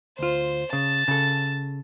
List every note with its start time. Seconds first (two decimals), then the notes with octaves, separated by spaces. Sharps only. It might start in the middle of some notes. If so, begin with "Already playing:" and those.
0.19 D2 F4 C5
0.73 C#3 A5
1.08 C#3 A4